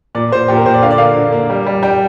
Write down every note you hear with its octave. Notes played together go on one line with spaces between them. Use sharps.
A#2 D5
A#2 C5
A#2 G4
A#4
A#2 C5
D5
D3 F5
D5
A#3 F5
D3
A#3
G3
G3
G3 G5